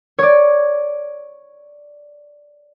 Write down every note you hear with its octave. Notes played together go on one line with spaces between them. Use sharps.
C#5 D5